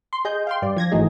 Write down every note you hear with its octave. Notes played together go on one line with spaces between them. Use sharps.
C6
G#4 D#5 G6
F5 G5 C6
G2 D5
F3 G#6 A#6
G#1 E3 F#3 A3 D#4 G#4